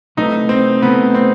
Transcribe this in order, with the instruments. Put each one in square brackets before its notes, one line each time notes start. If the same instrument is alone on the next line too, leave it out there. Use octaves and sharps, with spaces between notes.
[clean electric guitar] C3 F#3 A3 E4 B4 [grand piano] D#4
[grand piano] C4
[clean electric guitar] C3 F#3 A3 E4 B4 [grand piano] B3
[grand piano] C4